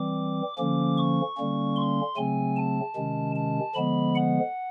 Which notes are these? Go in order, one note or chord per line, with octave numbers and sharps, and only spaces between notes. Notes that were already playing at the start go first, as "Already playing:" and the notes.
Already playing: E3 G3 C4 D6
D3 F3 A#3 C#4 D6
C#6
D3 G3 A#3 C#4
C6
C#3 F#3 A3 C4 G#5
A5
C3 D#3 G#3 C#4
A5
D3 F3 G#3 B3 B5
F#5